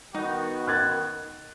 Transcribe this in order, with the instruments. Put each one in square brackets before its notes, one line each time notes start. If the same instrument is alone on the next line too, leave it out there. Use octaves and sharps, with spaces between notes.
[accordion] D#3 B3 [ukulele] D#4 [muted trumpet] F#4
[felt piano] F#6 G#6 A6